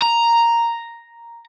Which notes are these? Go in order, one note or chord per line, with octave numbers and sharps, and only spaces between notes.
A#5